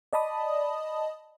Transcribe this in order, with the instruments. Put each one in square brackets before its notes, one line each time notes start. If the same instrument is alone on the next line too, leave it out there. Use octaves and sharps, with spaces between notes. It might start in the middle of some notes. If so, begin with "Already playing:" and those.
[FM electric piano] D5 D#5 A5 B5 D#6